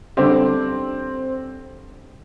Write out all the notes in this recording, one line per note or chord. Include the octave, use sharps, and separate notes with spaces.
D3 G3 C4 D4 G4